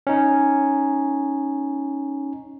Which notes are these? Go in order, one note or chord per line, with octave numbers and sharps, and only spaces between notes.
C#4 D#4